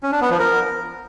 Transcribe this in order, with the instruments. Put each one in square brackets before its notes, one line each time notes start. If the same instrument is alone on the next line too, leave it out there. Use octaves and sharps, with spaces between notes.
[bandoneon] C#4
D4
B3
F3
A#4